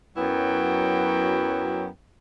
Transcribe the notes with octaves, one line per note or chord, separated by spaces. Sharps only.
F#2 F#3 B3 E4 F#4 G5